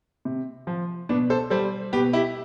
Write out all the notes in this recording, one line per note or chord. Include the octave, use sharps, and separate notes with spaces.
C3
F3
B2 B3 D4
A4 C5
G3 A4 C5
B2 G4 B4
E4 G4